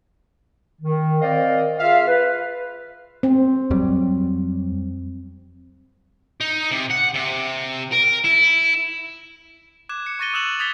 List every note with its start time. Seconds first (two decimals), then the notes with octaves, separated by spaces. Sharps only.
0.81 D#3
1.21 C4 A#4 C5 D5 D#5 F5
1.79 F4 G#4 E5 F5
2.07 B4
3.23 C4
3.70 F2 F#3 G3
6.41 D#4
6.71 C3
6.90 F#5
7.14 C3
7.93 A#4
8.25 E4
9.89 D6 F#6 G#6 E7
10.06 C#7
10.19 C#6 F#6 A6 A#6 D#7 G7
10.33 D#6 E6 F#6 E7 F#7
10.59 D#6 G#6 A6 B6 F#7 G7